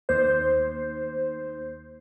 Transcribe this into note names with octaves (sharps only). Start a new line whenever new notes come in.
D#2 C5